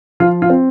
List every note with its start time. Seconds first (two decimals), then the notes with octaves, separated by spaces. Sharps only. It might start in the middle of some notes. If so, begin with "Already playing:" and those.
0.20 F3 F4
0.42 F4
0.50 C4